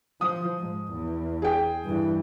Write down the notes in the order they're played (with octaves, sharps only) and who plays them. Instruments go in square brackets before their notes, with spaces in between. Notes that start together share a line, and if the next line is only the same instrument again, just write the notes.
[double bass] F3 [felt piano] D#6
[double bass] G#2
E2
[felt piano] G#4 G5
[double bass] G2 E3